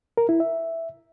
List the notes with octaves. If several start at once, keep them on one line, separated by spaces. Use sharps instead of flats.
A#4
E4
E5